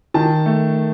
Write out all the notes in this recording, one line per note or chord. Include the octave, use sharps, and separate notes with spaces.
D#3 A5
A3